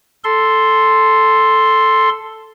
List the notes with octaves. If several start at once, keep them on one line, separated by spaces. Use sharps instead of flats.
A4 C6